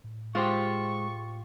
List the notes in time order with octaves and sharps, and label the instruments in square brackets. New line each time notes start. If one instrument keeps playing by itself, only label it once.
[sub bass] A2
[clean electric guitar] G#3 C5 [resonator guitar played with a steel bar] F4 G4 [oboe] C#6